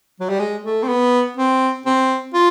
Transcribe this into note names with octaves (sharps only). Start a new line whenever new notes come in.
F#3
G3
G#3
A3
C4
B3
C4
C4
F4